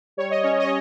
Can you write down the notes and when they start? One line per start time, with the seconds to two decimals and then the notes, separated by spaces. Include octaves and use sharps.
0.17 G3 C#5
0.31 D#5
0.43 C#4 C#5
0.59 D#5
0.63 C#4 C#5